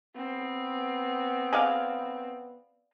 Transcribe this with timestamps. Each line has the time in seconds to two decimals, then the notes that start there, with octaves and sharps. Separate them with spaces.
0.16 B3 C4
1.53 G#4 D5 F5